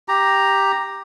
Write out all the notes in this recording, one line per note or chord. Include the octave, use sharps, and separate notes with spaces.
G4 A#5